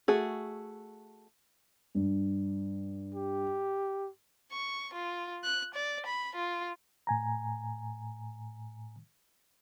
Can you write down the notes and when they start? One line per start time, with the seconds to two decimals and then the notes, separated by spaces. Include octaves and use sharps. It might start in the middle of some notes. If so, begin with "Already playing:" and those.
0.08 A3 F#4 G#4
1.95 G2
3.14 G4
4.52 C#6
4.94 F4
5.44 F#6
5.75 D5
6.06 B5
6.35 F4
7.07 A2 G#5 A#5